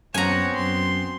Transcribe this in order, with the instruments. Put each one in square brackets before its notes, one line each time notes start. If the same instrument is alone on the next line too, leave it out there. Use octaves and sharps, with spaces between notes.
[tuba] F#2 [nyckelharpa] B3 C4 [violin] C#5 F#5 [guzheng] G#5 A#5
[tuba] F#2 [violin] C6